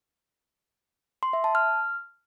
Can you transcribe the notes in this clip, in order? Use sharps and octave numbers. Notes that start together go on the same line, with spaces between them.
C6
E5
A5
F6